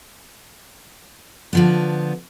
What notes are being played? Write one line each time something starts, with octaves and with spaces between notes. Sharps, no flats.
D3 F3 B3